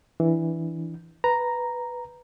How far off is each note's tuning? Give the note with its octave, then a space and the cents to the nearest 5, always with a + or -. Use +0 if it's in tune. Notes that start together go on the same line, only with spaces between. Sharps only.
E3 +0 D4 +0
B4 +0 A#5 +0